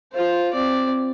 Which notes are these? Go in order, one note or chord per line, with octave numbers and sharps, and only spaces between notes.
F4 C5
C4 D5